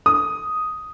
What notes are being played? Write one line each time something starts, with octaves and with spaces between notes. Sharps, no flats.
D#6